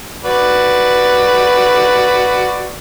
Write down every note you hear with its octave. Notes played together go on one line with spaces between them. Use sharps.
F#4 B4 D5